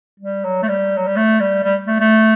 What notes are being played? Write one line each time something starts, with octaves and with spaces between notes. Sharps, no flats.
G3
F#3
A3
G3
F#3
G3
A3
G3
G3
A3
A3